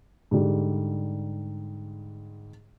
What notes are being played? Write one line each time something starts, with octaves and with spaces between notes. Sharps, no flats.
G#2 D3 G3